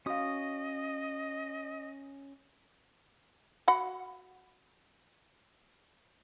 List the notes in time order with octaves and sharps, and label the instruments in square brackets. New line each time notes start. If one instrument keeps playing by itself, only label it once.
[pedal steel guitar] C#4 D#6 [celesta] F#4 F5 [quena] D#5
[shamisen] F#4 F#5 B5